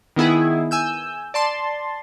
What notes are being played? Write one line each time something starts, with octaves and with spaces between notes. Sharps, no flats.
D#3 B3 E4 G#4
G#5 E6 G6
D5 A5 C6